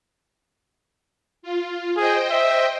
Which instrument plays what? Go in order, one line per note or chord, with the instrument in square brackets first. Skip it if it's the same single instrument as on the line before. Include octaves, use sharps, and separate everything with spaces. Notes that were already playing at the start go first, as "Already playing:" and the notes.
[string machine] F4
[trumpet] G#4 [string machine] C5 D#5 G5
[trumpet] E5